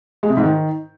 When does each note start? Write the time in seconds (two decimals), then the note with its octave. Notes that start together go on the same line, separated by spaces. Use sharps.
0.23 G#3
0.30 C3
0.37 G#2
0.44 D#3